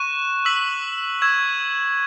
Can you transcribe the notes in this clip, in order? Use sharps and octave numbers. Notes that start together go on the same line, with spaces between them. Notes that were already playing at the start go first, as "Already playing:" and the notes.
Already playing: C#6 F#6 E7
E6 B6 F#7
C#6 E6 G#6 E7